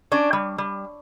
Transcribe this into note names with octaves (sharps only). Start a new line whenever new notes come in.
C#4 D4 D5
G3
G3